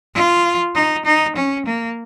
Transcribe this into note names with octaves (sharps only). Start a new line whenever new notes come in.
F4
D#4
D#4
C#4
A#3